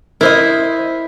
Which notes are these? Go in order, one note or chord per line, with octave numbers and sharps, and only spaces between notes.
E4 A#4 C5 D#5